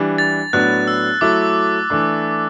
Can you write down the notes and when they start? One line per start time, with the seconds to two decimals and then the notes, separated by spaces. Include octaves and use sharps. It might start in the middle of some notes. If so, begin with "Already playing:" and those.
Already playing: E3 G3 D4
0.18 A6
0.53 A2 F#3 B3 D4 F#6
0.88 E6
1.21 F#3 A3 E4 D6
1.90 E3 A3 D4